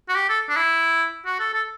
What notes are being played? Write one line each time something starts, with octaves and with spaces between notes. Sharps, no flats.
F#4
G4
A4
D4
E4
F#4
A4
A4